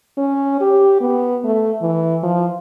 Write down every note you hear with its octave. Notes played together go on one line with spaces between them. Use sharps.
C#4
G4
B3
A3
E3
F3